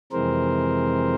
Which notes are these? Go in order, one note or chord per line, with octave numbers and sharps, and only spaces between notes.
F2 C3 E3 G#3 C4 A#4 C5